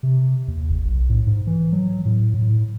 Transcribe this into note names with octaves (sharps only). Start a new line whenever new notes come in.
C3
D#2
F#1
B1
A2
G#2
E3
F#3
A2
A2